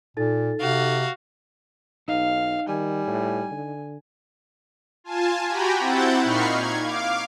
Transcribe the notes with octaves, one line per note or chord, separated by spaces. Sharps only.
A#2 D#4 A4 A6
C3 F#4 F5
B1 D#4 F5
D#3 G3 G#5
A2
D3
F4 G#5 A5
F#4 G4 G5 G#5 A#5 B5
C4 E4 F#5 G6 A6
A#2 D#4 B5 C#6 F6 C7
G#6
F5 D6